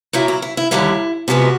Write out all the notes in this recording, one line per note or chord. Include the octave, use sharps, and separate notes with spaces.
A#2 F#3 A#3 E4
E4
E4
E4
D#2 D3 G3 A#3 E4
C3 F3 G#3 B3 F#4